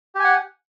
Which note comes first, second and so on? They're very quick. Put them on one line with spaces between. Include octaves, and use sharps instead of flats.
G4 G#5 F#5